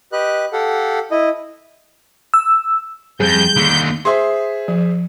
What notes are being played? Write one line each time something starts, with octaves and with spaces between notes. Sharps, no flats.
G4 B4 D#5 F#6
G4 A4 F5 F#5
E4 D#5
E6
F2 G#2 G3 G#4 G6
D#2 D3
G#4 C5 E5 C6
F3